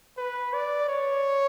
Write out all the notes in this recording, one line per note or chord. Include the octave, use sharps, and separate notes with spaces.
B4
D5
C#5